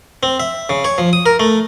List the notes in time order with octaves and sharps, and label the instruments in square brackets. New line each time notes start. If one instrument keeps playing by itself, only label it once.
[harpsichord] C4
E5
C#3
C#5
F3
D#6
A#4
A3